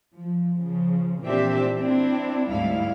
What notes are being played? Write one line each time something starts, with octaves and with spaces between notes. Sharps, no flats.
F3
C#3 F3
A#2 E3 C4 D4 G4 E5
C4 D4 E4
D2 G#2 G3 E4 F5